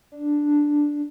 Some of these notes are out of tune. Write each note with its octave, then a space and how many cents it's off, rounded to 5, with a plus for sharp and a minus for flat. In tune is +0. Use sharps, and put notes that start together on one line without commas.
D4 +0